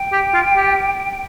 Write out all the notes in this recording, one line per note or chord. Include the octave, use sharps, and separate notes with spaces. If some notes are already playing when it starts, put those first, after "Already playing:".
Already playing: G5
G4
F4
G4